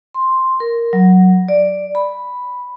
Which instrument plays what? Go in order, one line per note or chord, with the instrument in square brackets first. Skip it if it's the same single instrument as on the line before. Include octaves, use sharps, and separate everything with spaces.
[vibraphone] C6
A#4
F#3
D5
B5